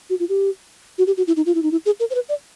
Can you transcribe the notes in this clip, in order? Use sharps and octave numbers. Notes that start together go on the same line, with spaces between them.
F#4
F4
G4
F#4
G4
F#4
E4
D#4
F4
E4
D#4
E4
G#4
A#4
C5
B4
D5